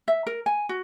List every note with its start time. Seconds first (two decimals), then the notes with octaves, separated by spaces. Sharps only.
0.08 E5
0.27 A#4
0.46 G#5
0.69 F#4